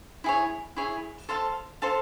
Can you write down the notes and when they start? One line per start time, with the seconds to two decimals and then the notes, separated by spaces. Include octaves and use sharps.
0.24 E4 G#4 C#5
0.76 E4 G#4 C#5
1.29 A4 C5 F5 A5
1.82 A4 C5 F5 A5